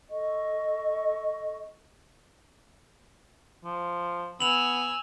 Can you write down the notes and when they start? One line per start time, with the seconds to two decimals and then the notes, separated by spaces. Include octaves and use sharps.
0.09 A4 D#5 C#6
3.64 F3
4.40 B3 G#5 E6 F7 F#7